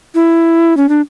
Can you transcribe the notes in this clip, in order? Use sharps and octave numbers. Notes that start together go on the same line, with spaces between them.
E4
C#4
D4